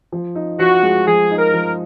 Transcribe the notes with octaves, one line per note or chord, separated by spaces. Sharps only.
F3
D#4
F3 F#4
G#3
F3 G#4
D#4
A#4
F3